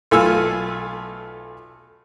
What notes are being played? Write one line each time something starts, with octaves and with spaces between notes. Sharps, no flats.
B1 A3 F4 G#5 E6